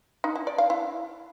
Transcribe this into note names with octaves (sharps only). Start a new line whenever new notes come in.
D#4
E4
D5
F5
E4